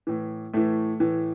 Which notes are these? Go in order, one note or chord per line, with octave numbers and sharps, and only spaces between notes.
A2 E3
A2 E3 A3
A2 E3